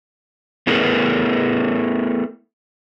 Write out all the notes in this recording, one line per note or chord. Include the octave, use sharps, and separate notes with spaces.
A3 B3 E4 G#4 A#4 B4